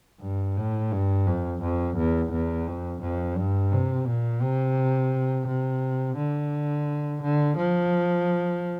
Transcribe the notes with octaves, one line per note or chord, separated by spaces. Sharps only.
G2
A2
G2
F2
F2
E2
E2
F2
F2
G2
C3
A#2
C3
C3
D3
D3
F3